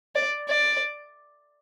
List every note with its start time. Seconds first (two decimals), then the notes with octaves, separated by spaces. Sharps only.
0.15 D5
0.48 D5